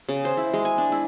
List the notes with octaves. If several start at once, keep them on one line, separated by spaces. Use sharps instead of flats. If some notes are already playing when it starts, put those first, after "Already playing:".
C#3
C5
E4
G#3
G#5
D4
E4